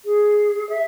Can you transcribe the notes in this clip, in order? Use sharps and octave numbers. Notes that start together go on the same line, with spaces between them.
G#4
E5